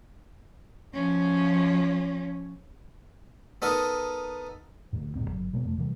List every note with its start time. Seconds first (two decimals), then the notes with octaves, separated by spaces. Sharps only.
0.93 F3 C#4
3.62 B3 D#4 A4 A#4
4.93 D2 G#2
5.15 D#1 C#2 A2 C4
5.28 G1 E2 F#3
5.53 B2 G#3 A#3 B3
5.65 F1 A3
5.78 C3 E3 F#3 G3